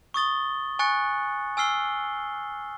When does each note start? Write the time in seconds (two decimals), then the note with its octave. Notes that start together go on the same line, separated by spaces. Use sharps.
0.14 C#6 D#6 A6 G7
0.79 G#5 C#6 F#6 A6 C#7
1.57 G#5 E6 F6 C7 G7